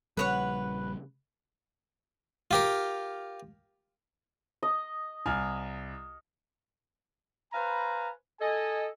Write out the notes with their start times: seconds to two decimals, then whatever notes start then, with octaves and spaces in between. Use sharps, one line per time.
0.17 A#1 C#3 G3 B4 C#5 F#5
2.51 F4 G4 A#4
4.63 D#5
5.26 C2 G#5 F6
7.53 B4 C5 F5 G#5 A#5 B5
8.41 A4 D#5 G#5